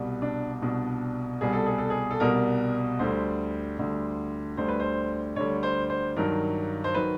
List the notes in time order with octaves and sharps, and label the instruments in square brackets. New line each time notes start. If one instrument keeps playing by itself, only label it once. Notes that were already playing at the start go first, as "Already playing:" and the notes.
Already playing: [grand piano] C2 B2 G3
D4
C2 B2 G3 D4
C2 B2 G3 G#4
A4
G#4
A4
G#4
A4
C2 B2 G3 A#4
D2 D3 G3 C5
D2 D3 G3
D2 D3 G3 C5
B4
C5
D2 D3 G3 C#5
C5
C5
G2 D#3 F#3 A#4
C5
D#3 F#3 B4